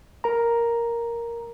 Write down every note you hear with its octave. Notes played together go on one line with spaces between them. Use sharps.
A#4 A#5